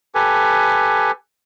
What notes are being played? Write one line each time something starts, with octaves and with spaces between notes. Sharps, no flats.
G4 A4 B4 G#5